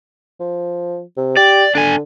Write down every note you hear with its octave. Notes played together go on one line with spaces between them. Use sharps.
F3
C3
G4 D5
D3 D4 G#5